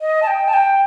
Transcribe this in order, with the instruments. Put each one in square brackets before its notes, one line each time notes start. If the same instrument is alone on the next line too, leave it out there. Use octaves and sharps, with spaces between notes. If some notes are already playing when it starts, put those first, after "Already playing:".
[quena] D#5
A5
G5
A5
G5